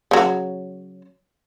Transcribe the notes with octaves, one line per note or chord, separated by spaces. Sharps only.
C#3 F#3